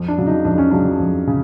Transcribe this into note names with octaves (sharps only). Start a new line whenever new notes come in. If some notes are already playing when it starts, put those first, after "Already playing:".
Already playing: F2
D4
C#3 F#3
D#4
F2 D4
C#4
C#3 F#3 D4
F2
C#3